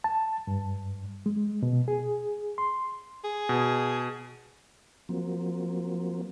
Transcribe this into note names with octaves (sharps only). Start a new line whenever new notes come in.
A5
G2
G#3
B2
G#4
C6
G#4
B2
F3 F#3 A#3 C4